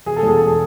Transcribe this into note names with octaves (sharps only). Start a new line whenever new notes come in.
E1 G#4
A4
E2 G#4
E1 A4
G#4